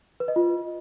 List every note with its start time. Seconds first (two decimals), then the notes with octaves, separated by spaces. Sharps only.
0.20 B4
0.28 D#5
0.36 F4